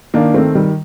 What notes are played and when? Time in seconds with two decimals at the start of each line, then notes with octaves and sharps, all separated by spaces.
0.14 D#3 A#3 D4
0.34 D#3 A3 C4
0.55 D#3 G3